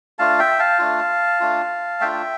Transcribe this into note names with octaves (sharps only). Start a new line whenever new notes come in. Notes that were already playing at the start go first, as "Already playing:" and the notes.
A3 D4 F4 F5 A5
E5 G5
F5 A5
A3 D4 F4
A3 D4 F4
A3 D4 F4 E5 G5